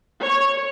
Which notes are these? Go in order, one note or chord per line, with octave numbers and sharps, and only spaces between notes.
C#5